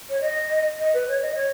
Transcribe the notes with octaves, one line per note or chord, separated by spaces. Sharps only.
C#5
D#5
D#5
B4
C#5
D#5
C#5